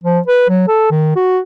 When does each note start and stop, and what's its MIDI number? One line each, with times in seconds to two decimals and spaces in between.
0.04 0.19 53
0.28 0.49 71
0.49 0.65 54
0.68 0.86 69
0.91 1.14 51
1.16 1.40 66